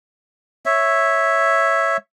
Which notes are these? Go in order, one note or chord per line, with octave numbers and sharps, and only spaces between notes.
C#5 E5